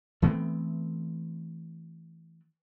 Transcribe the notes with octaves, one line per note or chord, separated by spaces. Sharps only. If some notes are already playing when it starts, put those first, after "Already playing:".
E3 A3 B3 C4